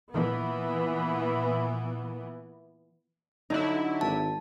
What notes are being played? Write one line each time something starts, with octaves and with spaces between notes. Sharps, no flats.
A#2 E3 B3
D3 F#3 D#4 E4
G#1 A5